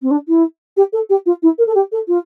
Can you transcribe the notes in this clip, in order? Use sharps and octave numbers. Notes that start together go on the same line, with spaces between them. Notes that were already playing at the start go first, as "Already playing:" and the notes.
C4
D4
E4
G4
A4
G4
F4
E4
A#4
A4
G4
A4
F4